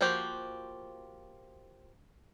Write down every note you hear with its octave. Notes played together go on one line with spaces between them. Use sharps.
F3 A#3 F#4 G4 C5